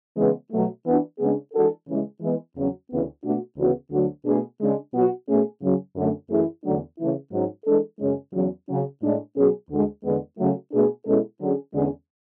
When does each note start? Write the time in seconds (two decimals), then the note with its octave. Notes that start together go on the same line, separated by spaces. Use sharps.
0.17 C#3 E3 G#3 B3
0.51 B2 F#3 A3
0.85 E3 B3 D4 F#4
1.19 C#3 G#3 B3 D4 G#4
1.53 E3 G#3 D4 F#4 A4
1.88 C#3 E3 G#3
2.21 E3 G#3 B3
2.55 E2 C#3 F#3 C#4
2.89 D2 C#3 E3 B3
3.24 B2 A3 D4 F#4
3.57 D2 C#3 E3 B3 F#4
3.92 D2 D3 F#3
4.25 B2 A3 D4 G#4
4.60 C#3 G#3 D4
4.93 B2 F#3 B3 F#4
5.28 B2 A3 C#4 G#4
5.62 F#2 C#3 F#3
5.96 F#2 D3 A3
6.30 F#2 E3 A3 E4 G#4
6.63 E2 D3 F#3 A3 D4
6.98 C#3 E3 A3 E4
7.32 G#2 F#3 C#4
7.66 E3 G#3 D4 A4
8.00 F#2 C#3 G#3 C#4
8.34 E2 C#3 F#3
8.68 C#3 F#3 C#4
9.02 A2 G#3 D4
9.36 B2 F#3 C#4 G#4
9.70 D2 D3 G#3
10.04 E2 D3 G#3 B3
10.38 C#3 F#3 A3
10.72 B2 A3 D4 G#4
11.06 B2 G#3 C#4 E4 A4
11.39 D3 F#3 C#4 G#4
11.74 E2 D3 G#3 C#4 G#4